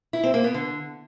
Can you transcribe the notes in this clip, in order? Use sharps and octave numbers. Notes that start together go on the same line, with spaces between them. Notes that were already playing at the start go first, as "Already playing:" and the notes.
E4
C4
A#3
B3
D3